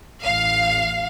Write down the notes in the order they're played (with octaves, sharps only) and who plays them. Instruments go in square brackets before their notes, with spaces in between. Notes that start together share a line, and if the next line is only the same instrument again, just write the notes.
[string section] A1 F5